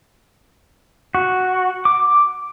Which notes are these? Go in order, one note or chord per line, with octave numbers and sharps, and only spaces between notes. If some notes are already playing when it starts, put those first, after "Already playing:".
F#4
D6